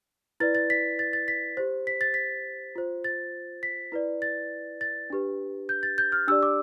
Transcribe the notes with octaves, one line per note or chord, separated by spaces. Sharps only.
E4 B4 D5 A6
A6
B6
A6
A6
B6
G4 C5
B6
A6
B6
F4 C5
A6
B6
E4 B4 D5
A6
A6
D4 G4 B4
G6
A6
G6
F6
D4 G4 D5 E6
D6